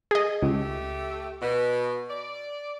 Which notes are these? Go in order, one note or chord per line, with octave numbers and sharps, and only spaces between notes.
G#4 D#5
C#2 A3 G4
B2
D5